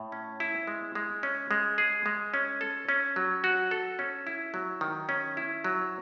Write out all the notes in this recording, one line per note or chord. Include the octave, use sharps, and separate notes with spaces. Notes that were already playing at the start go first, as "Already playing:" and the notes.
Already playing: A2
C#4
E4
G#3
G#3
C#4
G#3
G#4
G#3
C#4
A4
C#4
F#3
F#4
A4
C#4
E4
F#3
D#3
C#4
E4
F#3